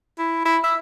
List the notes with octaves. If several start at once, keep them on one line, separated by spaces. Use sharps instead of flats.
E4
E4
E5